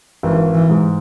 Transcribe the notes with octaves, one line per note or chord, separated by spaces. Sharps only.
G#1 E3
E3
G#2 G#3